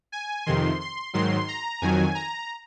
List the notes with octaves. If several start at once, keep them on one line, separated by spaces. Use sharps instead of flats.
G#5
F2 C3 D#3 C6
C6
G#2 D#3 F#3 C6
A#5
F2 D#3 F#3 G#5
A#5